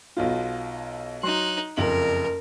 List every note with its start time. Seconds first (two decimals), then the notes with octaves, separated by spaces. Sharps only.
0.17 B1 B2 F4
1.23 F#3 D#4 C6 F#6
1.77 F#1 F2 A#4 F#7